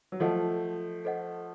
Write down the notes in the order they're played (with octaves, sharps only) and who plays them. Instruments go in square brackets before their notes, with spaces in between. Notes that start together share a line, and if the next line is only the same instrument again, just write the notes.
[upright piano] F#3
[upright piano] F3 A3 [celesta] A4 C5 D#5 F#5
[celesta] A4 C5 D#5 F#5